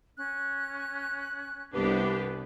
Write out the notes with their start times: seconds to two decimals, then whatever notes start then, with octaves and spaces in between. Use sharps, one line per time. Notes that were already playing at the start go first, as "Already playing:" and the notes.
0.16 C#4 F#6
1.74 C2 B3 D4 G4 B4